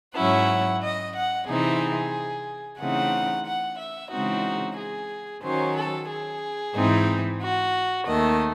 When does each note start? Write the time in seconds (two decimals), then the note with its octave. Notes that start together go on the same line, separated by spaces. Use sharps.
0.16 G#2 F#3 C#4 E4 F#5
0.82 D#5
1.15 F#5
1.48 C3 E3 C4 D#4 G#4
2.80 C#3 E3 A3 C4 D#4 F#5
3.46 F#5
3.78 E5
4.12 C#3 E3 G#3 C4 D#4 F#4
4.77 G#4
5.43 D#3 F#3 C#4 C5
5.76 A4
6.10 G#4
6.75 G#2 E3 C4 D#4
7.42 F#4
8.07 D#2 D#3 A3 D#5